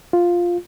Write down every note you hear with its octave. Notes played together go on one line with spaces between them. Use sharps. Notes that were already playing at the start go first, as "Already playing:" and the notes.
F4